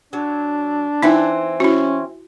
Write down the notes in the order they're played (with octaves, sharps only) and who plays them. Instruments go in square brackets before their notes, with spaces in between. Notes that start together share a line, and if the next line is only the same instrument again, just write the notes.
[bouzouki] F#3 [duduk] D4
[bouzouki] E3 C4 [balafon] D#4 E4
[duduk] C#4 [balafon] E4 F#4